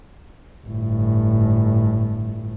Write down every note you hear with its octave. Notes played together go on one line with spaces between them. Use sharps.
G1 A2